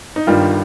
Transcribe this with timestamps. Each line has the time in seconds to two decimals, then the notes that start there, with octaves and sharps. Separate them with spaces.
0.16 D#4
0.27 G1 G2 D#3 G3 F4